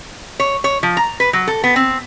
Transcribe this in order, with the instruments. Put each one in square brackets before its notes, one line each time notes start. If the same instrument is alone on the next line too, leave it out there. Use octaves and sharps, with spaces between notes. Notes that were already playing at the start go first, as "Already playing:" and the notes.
[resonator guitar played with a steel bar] C#5
C#5
F3
A#5
B4
F#3
A4
B3
C4